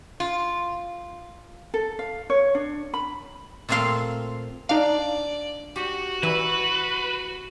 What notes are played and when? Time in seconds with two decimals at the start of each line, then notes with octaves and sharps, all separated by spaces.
0.20 F4
1.74 A4
1.99 F5
2.30 C#5
2.55 D4
2.94 B5
3.69 A#2 A3 C4 A4 F5 C6
4.69 D4 D#4 D5 F5
5.76 F#4 G4
6.23 E3 E4 B4